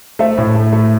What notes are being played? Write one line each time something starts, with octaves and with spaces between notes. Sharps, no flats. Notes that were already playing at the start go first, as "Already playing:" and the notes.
A3 C5 E5
A2
A3
A3